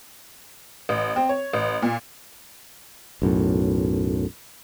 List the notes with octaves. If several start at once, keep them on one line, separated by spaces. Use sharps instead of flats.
A1
C4
C#5
A1
A#2
B1 F#2 A2